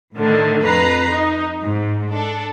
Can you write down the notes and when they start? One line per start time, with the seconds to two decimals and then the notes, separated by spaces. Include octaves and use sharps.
0.16 A2 D3 D#3 A3
0.63 F2 B4 A#5 C7
1.10 D#4
1.63 G#2
2.11 D4 A4